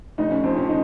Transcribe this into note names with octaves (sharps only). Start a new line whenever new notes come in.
F1 D#4
C#4
F2 C4
C#4
D#4